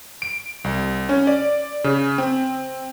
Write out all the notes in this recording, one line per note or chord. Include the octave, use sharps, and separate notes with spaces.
D7
C2
C#4
D5
C#3
C4